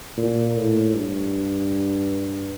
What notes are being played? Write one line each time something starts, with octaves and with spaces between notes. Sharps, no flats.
A#2
A2
G2